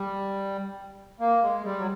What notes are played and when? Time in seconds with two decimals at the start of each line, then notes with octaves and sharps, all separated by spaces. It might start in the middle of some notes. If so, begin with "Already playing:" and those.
Already playing: G3
1.20 A#3
1.42 G#3
1.65 G3
1.79 F#3